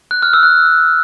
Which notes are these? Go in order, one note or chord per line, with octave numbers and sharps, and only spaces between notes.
F#6
F6
E6
F#6